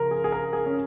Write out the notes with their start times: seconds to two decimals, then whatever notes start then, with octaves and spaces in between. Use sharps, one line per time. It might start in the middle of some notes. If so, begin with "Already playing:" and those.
Already playing: C#3 F3 A#4
0.11 G#4
0.24 G#4
0.32 A#4
0.53 G#4
0.66 C#4